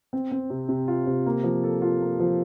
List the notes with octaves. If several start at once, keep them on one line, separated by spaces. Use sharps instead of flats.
C4
C4
C3
C3
F4
C3
A#3
F3
A4
F4
A#3
F3